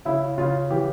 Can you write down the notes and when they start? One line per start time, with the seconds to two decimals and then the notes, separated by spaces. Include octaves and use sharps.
0.05 C#3 E4
0.38 C#3 F4
0.71 E3 G4